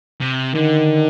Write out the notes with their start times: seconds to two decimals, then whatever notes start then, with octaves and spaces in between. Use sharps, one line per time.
0.21 C3
0.55 D3 D#3